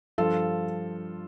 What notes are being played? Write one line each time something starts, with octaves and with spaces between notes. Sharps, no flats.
G2 F3 F4 A4